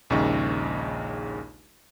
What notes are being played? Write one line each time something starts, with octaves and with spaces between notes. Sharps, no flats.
A#1 D#2 C#3 G#3 D#4 C#6